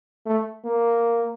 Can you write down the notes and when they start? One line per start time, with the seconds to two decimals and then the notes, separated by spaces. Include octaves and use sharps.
0.26 A3
0.64 A#3